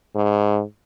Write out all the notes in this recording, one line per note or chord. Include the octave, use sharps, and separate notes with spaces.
G#2